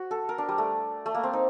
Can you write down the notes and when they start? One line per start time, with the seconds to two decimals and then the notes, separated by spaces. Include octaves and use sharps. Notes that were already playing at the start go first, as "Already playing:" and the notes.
Already playing: F#4
0.11 A4
0.29 A#4
0.38 D4
0.49 G3
0.58 A3
1.06 A3
1.15 A#3
1.24 C4
1.33 D#4